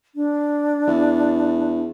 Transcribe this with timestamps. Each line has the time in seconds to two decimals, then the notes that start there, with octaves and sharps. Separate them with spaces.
0.15 D4
0.87 E2